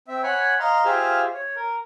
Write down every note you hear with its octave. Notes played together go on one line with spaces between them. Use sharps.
C4 E5
C#5 F#5 G#5 B5
D#5 F5 A#5 C6
F4 G4 G#4 C5 E5 F5
C#5
A#4